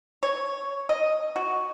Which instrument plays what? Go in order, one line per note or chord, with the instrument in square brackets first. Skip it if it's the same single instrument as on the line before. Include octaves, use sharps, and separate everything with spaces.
[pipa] C#5
D#5
F#4